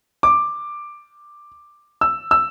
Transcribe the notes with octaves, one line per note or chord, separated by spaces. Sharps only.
D6
E6
E6